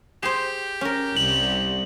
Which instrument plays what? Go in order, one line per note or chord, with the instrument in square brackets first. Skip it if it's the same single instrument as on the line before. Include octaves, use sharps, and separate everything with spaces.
[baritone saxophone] G4 [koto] G#4 C5
[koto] C#4 A#4
[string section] C2 [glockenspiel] F#7